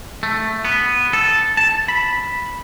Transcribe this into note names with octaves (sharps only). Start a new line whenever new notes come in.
A3
B3
A4
A5
B5